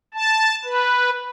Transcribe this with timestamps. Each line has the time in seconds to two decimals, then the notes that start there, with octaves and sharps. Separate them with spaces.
0.14 A5
0.65 B4